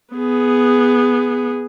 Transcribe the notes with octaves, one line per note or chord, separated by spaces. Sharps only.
B3 G#4